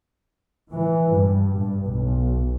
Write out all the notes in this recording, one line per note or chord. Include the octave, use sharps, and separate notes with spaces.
E3
G2
G2
B1